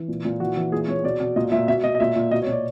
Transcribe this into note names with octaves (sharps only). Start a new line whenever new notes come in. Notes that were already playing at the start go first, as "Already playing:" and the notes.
Already playing: E3
A#2
A#2
E3 F#4
E3
A#2 G#4
A#2 C#5
B2 D5
B2
A#2 D#5
A#2 E5
B2 E5
B2 D#5
D#5
A#2 E5
A#2
B2 D#5
C#5
B2
D5